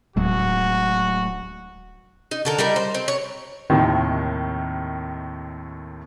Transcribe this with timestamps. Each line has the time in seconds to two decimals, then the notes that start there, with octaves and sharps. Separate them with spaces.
0.16 D1 A2 F#3 G#3 F#4
2.31 D#4
2.45 D3 A4 A#4
2.58 G3 D#4 E4 A#4
2.76 C5
2.94 C4
3.08 C#5
3.70 D#2 A2 C3 D#3